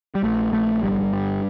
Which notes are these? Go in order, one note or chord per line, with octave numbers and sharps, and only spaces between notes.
G3
A#1 A3
A#1 A3
G1 G3
G2